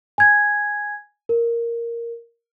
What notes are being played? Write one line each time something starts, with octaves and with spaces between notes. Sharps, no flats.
G#5 G#6
A#4